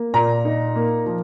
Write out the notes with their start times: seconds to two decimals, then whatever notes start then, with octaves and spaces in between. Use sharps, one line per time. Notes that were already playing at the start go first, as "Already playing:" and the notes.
Already playing: A#3
0.14 A#2 A#5
0.45 D#4
0.75 A#3
1.06 F3